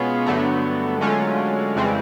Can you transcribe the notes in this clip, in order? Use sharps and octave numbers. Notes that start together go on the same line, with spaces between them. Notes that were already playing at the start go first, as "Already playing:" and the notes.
Already playing: B2 G#3 B3 C#4 F4
G2 D3 F#3 A3
D3 F#3 G#3 A3 C#4 F4
F2 C#3 E3 G3 C4